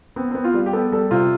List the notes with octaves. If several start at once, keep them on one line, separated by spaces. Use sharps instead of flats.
B3 C4
B3 C4
F4
G3
G4
B3 A4
G3 A4
C3 F4